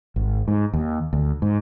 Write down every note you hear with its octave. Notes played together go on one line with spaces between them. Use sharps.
G#1
G#2
D#2
D2
G#2